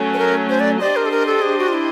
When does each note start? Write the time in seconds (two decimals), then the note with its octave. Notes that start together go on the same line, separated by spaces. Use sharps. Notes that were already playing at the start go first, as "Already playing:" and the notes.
Already playing: F#3 A3 C#4
0.14 B4
0.18 A#4
0.49 C5
0.60 D5
0.80 D4 G4 C5 D5 D#5
0.96 A#4
1.05 A4
1.11 A#4
1.26 A4
1.42 G#4
1.58 F#4
1.68 F4
1.73 E4